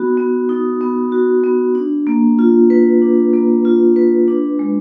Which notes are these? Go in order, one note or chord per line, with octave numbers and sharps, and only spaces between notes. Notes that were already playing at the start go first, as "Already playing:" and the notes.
Already playing: B3 D#4 F#4
B3
D#4
B3
F#4
B3
D4
A#3
F4
B4
D4
A#3
F4
B4
D4
G#3